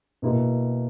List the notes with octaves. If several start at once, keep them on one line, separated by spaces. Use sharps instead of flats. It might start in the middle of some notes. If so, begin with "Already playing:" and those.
B2 A#3 E4